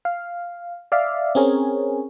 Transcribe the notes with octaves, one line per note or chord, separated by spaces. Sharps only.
F5
D5 E5 F5
C4 C#4 G#4 A#4 C#5